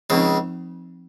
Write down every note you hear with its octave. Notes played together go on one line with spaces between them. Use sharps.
C#2 C#3 F3 C4 D#4